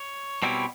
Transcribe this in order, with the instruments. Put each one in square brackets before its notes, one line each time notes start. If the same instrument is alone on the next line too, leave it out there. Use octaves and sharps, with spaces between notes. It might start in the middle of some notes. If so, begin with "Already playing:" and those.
Already playing: [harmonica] C#5
[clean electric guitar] B2 G3 C4 E4 [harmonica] C#5